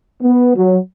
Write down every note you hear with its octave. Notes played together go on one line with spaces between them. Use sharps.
B3
F#3